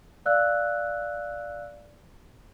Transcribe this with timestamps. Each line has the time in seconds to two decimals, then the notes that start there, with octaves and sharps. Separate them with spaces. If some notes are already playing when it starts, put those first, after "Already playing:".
0.26 D5 F5 E6 F#6